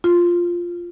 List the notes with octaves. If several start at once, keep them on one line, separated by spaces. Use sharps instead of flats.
F4